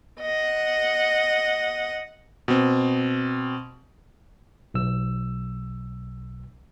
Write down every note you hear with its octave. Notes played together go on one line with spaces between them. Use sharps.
D#5 F#5
B2 C4
B1 E6